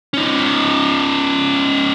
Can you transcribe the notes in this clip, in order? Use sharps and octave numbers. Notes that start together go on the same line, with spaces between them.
C#4 D#4